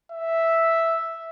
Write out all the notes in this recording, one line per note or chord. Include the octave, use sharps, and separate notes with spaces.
E5